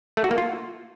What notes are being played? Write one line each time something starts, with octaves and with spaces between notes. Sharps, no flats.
A3
F#4
A#3
F4